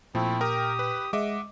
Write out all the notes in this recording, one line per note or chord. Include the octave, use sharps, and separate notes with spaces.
A#2 F3 A3 C4 E4
G4 A#4 G5 D#6
B4
G#3 D#5 E5 F#5 D6